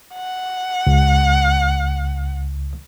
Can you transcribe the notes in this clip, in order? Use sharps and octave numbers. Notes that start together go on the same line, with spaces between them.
F#5
C#2